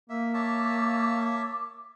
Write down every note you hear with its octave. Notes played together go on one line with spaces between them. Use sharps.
A#3 E5
C#5 E5 A5 D6